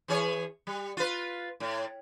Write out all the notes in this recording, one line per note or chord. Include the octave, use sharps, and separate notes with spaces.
E3 G#4 C#5
G3
F4 B4
A2